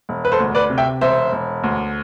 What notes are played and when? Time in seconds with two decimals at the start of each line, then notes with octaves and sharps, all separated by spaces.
0.09 E1
0.25 B4
0.32 A4 C5
0.40 D2
0.55 B4 D5
0.70 C3
0.78 E5 G5
1.01 E1 C5 E5
1.32 E1
1.64 D2